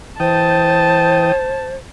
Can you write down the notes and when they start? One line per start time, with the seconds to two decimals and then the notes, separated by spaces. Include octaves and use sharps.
0.20 E3 C5 G5 A5 D#6